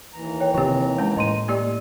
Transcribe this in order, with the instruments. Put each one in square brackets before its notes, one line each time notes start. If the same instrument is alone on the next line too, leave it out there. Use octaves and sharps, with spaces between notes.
[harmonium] D#2 E3 A#5
[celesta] C#5 G5
[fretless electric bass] C3 F3 [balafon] D#3 G4
[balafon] G#3 C#4
[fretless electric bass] A2 [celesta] D#5 C6 D#7
[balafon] A#3 G4 D5